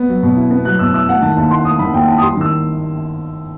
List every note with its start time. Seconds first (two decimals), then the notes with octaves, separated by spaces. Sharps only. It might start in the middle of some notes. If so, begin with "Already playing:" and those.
Already playing: B3
0.09 F#3
0.23 B2
0.36 E4
0.51 B3
0.65 F#3 F#6
0.79 B2 E6
0.93 E4 E6
1.09 A3 F#5
1.22 D#3 A5
1.36 D#2 A5
1.51 E4 C6
1.65 A3 D#6
1.79 D#3 B5
1.94 D#2 G5
2.08 E4 A5
2.18 D#6
2.22 G3 C6
2.37 D#3 E6